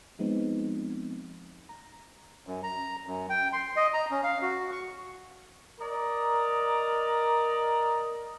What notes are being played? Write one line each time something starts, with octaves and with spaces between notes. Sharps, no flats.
F3 G#3 B3 C4 D#4
A#5
F#2
A#5
F#2
G5
C6
D#5
A#5
C#4
F5
F#4
C#6
A#4 D5 D#5 A#5